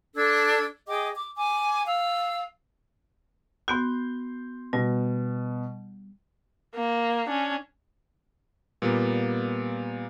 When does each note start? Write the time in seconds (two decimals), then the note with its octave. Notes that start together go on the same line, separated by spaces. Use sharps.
0.15 D4 A4 E6 G#6
0.88 G#4 D#5 G5 D6
1.15 D6
1.36 G#5 D6
1.86 F5 E6
3.68 B3 F#4 C6 G6
4.73 B2 G3
6.75 A#3
7.26 C#4 D4
8.82 A#2 G3 A#3 B3